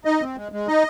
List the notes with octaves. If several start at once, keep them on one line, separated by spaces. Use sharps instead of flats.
D#4 D#5
C4
G#3
G#3
D#4 D#5